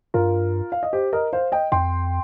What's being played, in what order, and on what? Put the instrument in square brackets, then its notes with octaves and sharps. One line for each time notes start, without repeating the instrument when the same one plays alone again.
[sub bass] G2 [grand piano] F4 A#4
[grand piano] F5
D#5
G4 C5
A#4 D#5
C5 F5
D#5 G5
[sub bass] F2 [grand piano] G5 C6